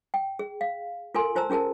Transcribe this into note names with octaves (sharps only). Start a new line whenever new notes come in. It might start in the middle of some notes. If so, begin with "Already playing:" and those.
G5
G#4
F5
F4 A4 A#4 G#5 C6
F4 C5 A5 A#5 E6
C#4 F4 G#4 A#4 A5